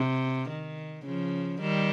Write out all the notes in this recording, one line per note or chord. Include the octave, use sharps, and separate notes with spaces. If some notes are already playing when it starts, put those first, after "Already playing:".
Already playing: C3
D#3
C#3 F3
D#3 G3